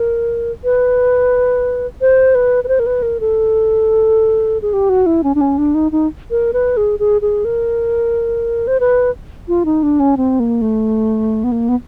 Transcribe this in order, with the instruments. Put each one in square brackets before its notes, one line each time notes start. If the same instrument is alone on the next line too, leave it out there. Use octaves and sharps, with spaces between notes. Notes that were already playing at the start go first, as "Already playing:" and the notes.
Already playing: [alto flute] A#4
B4
C5
B4
B4
C5
A#4
B4
A#4
A4
G#4
G4
F#4
E4
C#4
D4
C#4
D4
D#4
D#4
A#4
B4
G#4
G#4
G#4
A#4
C5
B4
F4
D#4
D4
C#4
C4
A#3
A3
B3
A#3
B3